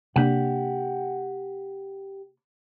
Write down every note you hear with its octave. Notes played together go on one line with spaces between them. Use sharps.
C3 A#3 D4 G4 F#5